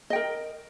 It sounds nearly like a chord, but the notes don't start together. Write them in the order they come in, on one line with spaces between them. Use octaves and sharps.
D#5 G5 A#4